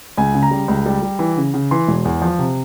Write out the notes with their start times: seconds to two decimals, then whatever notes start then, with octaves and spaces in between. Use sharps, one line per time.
0.18 C#2 G#5
0.34 C#3
0.43 A#5
0.51 G3
0.68 C#2
0.86 G3
1.03 G3
1.19 E3
1.37 C#3
1.54 C#3
1.71 E3 C6
1.88 E1
2.05 E2
2.22 F3
2.39 C3